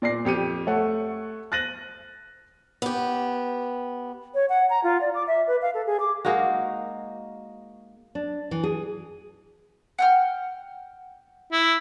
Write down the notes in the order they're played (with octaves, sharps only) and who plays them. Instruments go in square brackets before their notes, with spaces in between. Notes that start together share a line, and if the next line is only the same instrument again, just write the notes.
[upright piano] A#2 D5 A#6 C7
F2 G4 C#7 D#7
A3 A4 C#5 F#5
F#6 A6 A#6 D#7 F#7
[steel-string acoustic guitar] B3 G4
[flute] C#5
F#5
A#5
F4
D5
D6
E5
B4
F5
A4
G#4
D6
[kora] G#3 A#3 D#4 F#4
[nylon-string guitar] D4
E3
G#4
[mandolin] F#5 G5 F6
[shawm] E4